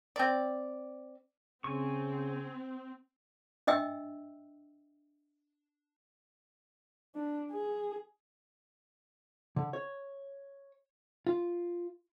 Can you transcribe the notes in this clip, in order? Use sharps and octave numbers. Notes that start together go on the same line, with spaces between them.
C4 D5
C#3 C4 G#5 C#6
D4 D#5 E5 G5 E6
D4
G#4
D3
C#5
F4